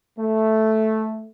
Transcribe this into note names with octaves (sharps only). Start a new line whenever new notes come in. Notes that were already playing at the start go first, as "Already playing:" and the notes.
A3